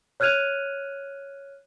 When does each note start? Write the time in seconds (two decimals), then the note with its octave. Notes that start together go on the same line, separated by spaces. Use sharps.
0.20 C#5 F6 F#6 G#6 D#7 F7